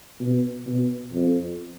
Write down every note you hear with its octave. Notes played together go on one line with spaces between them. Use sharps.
B2
B2
F2